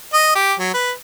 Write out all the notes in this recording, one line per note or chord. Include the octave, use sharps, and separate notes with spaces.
D#5
G4
F#3
B4